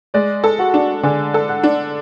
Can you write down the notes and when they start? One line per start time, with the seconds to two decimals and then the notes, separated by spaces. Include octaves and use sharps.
0.14 G#3 D5
0.44 A4
0.59 F#4 F#5
0.74 D4
1.03 D3 G#4 G#5
1.34 A4
1.48 F#5 F#6
1.64 D4